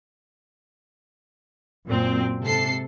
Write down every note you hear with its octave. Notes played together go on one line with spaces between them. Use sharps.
F#2 A#2 C4
G#2 C3 A4 C7